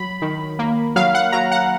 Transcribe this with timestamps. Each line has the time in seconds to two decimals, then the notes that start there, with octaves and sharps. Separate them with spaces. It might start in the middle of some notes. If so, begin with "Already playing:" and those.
Already playing: F#3 B5
0.22 D#3
0.59 A#3
0.96 F#3 F5
1.14 F#5
1.32 F#3 A#5
1.51 F#5